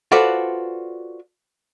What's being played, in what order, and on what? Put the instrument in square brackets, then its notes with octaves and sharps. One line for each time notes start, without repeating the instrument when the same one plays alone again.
[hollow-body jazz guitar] F4 F#4 A4 B4 C5 D5